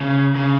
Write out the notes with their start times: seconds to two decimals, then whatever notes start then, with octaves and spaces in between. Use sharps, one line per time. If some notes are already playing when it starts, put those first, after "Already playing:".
0.01 C#3
0.36 C#3